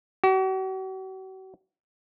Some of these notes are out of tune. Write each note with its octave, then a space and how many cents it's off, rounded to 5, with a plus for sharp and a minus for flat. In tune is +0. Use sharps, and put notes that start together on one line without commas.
F#4 +40